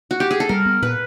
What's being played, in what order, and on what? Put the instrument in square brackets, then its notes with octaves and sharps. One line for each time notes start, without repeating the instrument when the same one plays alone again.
[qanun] F#4
G4
G#4
A4
[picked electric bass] G3 [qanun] A#4
[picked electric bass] B3
[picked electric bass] A#2 [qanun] B4